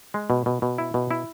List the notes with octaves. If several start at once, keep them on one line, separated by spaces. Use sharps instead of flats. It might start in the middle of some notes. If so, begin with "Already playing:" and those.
G#3
B2
B2
B2
E4
B2
E4